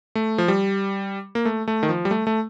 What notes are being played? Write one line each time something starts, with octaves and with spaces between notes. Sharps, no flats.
A3
F3
G3
A#3
A3
A3
D#3
F3
G3
A3
A3